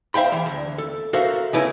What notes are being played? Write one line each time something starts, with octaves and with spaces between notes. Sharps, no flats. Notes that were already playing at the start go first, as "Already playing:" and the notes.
C5 E5 F5 G5 B5
E3
D2
A4
F#4 A4 A#4 C5 E5 F5
C#3 F3 A3 C#4 E4 B4